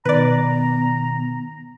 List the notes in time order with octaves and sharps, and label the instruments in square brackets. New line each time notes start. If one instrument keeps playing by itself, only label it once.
[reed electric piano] B2 D#3 [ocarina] B3 [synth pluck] B4 D5 [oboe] A#5